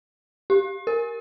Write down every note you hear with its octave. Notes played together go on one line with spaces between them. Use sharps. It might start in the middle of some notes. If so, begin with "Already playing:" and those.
G4
A#4